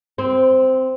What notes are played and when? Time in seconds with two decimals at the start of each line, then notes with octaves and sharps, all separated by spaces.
0.18 C4